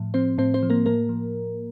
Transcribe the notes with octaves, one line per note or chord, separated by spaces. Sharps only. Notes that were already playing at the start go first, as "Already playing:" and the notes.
Already playing: A2 F3
F3 C4 C5
A2 C4 C5
C4 C5
F3
A#3 A#4
A2 A#3 A#4
F3